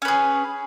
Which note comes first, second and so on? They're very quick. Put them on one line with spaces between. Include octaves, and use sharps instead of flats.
C#4 B4 G#4